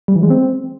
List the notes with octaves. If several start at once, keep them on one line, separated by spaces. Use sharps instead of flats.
G3
E3
G#3
C4